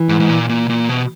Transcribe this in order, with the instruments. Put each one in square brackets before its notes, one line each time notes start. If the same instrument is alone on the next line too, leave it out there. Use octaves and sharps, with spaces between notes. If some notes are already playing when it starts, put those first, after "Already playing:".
Already playing: [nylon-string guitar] E3
[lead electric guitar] G#2
G#2
A#2
A#2
A#2
B2